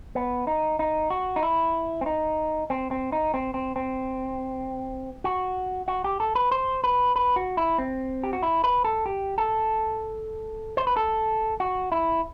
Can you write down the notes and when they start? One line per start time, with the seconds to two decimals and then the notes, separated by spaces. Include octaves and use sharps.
0.15 B3
0.47 D#4
0.79 D#4
1.10 F#4
1.36 D#4
1.43 E4
2.01 C4
2.06 D#4
2.70 C4
2.91 C4
3.12 D#4
3.34 C4
3.54 C4
3.76 C4
5.24 F#4
5.88 F#4
6.04 G4
6.20 A4
6.35 B4
6.51 C5
6.84 B4
7.16 B4
7.36 F#4
7.57 E4
7.78 C4
8.24 G4
8.33 F#4
8.43 E4
8.64 B4
8.84 A4
9.06 G4
9.38 A4
10.77 C5
10.87 B4
10.96 A4
11.60 F#4
11.92 E4